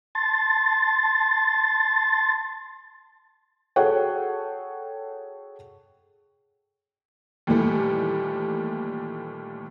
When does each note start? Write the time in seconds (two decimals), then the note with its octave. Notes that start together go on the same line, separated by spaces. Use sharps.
0.15 A5 C6 A6
3.76 F#4 G#4 A4 C#5 F#5 G5
7.47 D#2 A#2 E3 G3 A3